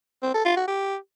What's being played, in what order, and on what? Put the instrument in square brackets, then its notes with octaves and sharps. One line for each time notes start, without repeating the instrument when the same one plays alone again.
[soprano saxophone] C4
A4
F4
F#4
G4